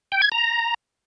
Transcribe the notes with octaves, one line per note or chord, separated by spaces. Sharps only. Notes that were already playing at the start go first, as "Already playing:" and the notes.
G5
G#6
A#5